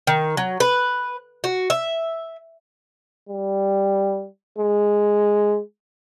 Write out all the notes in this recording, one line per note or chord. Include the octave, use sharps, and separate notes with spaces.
D#3
F#3
B4
F#4
E5
G3
G#3